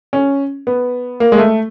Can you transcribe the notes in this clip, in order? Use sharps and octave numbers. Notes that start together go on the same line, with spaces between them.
C#4
B3
A#3
G#3
A3